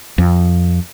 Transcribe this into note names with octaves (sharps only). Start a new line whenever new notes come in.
F2